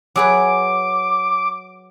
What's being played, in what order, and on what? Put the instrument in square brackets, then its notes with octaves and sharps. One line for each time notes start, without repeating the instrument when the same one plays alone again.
[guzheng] F#3 G#4 B4 [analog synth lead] D6